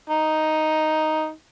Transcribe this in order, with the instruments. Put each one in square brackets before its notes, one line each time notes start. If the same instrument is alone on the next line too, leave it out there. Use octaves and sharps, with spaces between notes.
[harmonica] D#4